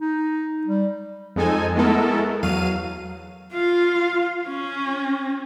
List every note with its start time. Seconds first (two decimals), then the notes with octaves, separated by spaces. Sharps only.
0.01 D#4
0.67 G3
1.36 F2 G#3 D#4 A4 G#5
1.75 G#3 A3 B3 E4 A4 A#4
2.43 E2 F#3 F5 D#7
3.53 F4 F5
4.47 C#4